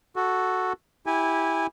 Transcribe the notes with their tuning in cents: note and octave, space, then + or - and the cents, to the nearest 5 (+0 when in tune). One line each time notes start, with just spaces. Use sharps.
F#4 +0 A4 +0
E4 -10 G4 +0 G#5 -15